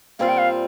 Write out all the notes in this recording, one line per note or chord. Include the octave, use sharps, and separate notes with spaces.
A#2 G3 C4 F4 F5
G5
F5